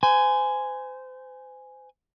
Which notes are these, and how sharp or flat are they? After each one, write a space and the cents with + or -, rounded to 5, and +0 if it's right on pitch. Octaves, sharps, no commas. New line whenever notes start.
C5 -35 G#5 +0